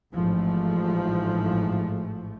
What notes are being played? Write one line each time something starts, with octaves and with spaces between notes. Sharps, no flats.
A1 G#2 F3 A3